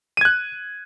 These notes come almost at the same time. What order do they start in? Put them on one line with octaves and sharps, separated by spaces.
D#7 G#6 F#6